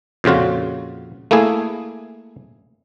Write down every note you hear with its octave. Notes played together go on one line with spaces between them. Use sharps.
F2 A#2 C#3 F4 F#4
A3 A#3 E4 G#4